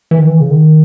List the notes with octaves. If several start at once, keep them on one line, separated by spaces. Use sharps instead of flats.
E3
D#3
E3
C#3
D#3